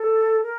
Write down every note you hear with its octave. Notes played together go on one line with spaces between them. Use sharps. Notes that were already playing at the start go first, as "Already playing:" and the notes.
Already playing: A4
A#4